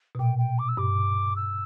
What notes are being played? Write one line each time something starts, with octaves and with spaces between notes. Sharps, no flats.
B2
A#2 G5
G5
D6
E6
G2 D6
E6